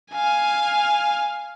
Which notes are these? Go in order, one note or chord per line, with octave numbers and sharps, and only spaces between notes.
F5 G#5